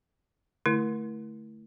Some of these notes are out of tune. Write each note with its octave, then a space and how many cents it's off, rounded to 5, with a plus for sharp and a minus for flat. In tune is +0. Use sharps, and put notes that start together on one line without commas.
D3 +0 A3 +0 E4 +0